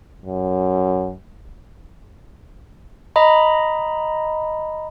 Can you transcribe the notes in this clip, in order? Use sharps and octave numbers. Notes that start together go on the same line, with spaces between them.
F#2
D#5 A#5 B5